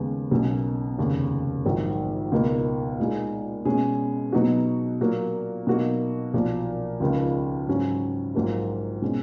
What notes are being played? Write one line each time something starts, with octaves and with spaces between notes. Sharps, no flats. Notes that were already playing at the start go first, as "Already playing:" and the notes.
Already playing: D#2 C#3 G#3 B3
B1 B2 F#3 A#3 C#4
F1 D#2 C#3
A#1 G#2 D#3 F#3
C#2 B2 A#3 D#4
A#2 G#3 D#4 G#4
B2 G#3 C#4 G#4
B2 F#3 B3 D#4 F#4
A#2 F#3 A#3
B2 F#3 A#3 D#4 F#4
B1 A#2 F3
C#2 C#3 F3 A#3 D#4
G#2 F#3 C#4
A#1 G#2 F#3 A#3 F4
B2 G#3 C#4